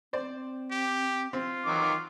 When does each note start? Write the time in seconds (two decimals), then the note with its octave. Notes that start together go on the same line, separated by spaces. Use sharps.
0.13 C4 C5 D5
0.71 G4
1.33 C4 F4
1.66 D#3 E3 F#3 D6